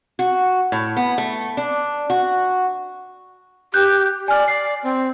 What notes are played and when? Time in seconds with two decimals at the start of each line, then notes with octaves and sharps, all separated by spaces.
0.19 F#4
0.72 A2
0.97 B3
1.18 A3
1.57 D4
2.10 F#4
3.74 G4 F#6 G6
4.28 D5 G#5 F6
4.48 D5 C7
4.83 C4